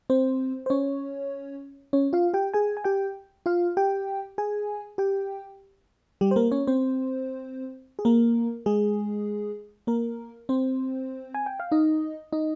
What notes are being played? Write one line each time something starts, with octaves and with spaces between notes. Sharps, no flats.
C4 C5
C5
C#4 C#5
C#4 C#5
F4 F5
G4 G5
G#4 G#5
G#5
G4 G5
F4 F5
G4 G5
G#4 G#5
G4 G5
G3 G4
C5
A#3 A#4
C#4 C#5
C4 C5
G#4
A#3 A#4
G#3 G#4
A#3 A#4
C4 C5
G#5
G5
F5
D#4 D#5
D#4 D#5